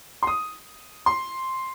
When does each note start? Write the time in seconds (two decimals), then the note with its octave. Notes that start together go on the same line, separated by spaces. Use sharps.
0.23 C6
0.27 D#6
1.06 C6